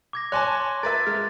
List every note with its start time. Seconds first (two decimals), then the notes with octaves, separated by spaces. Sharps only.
0.13 D6 G#6 A#6
0.32 C#5 G#5 A5 C6 D6 F#6
0.83 A#4 B4 E5 A6
1.07 G#3 F6